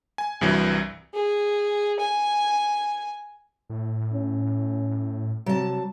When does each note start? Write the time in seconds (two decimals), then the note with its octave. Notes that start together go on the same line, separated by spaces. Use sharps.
0.18 G#5
0.41 C2 G2 E3 F#3
1.14 G#4
2.00 G#5
3.70 A2
4.14 C#4
5.46 C3 F#3 A5